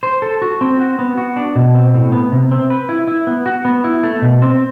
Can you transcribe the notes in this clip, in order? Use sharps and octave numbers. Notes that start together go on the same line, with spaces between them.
C5
A4
F#4
C4
F#4
B3
F#4
D4
B2
C4
A2
B3
C3
C4
B4
E4
E4
B3
F#4
B3
E4
A3
B2
C4